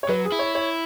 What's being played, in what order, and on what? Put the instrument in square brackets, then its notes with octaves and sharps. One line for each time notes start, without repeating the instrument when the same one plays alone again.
[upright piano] C#5
[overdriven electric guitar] F#3 [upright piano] B4
[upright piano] G#4
[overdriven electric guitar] E4
[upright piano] C#5
C#5